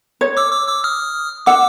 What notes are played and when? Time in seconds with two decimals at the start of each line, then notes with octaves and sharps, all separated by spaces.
0.21 C#5
0.37 D6 E6
0.52 D6 E6
0.68 D6 E6
0.84 D#6 F6
1.46 F#5 D6 E6